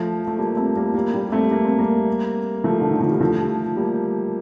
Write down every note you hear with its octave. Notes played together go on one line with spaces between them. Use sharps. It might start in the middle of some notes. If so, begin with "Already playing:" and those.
Already playing: F3 A3
A3
G3 A#3
A3 C4
G3 A#3
G3 A#3
G3 A#3
A3 C4
A#3
C4
G3 A#3
F3 A3
D3
D#3
F3
G3
F3 A3
G3 A#3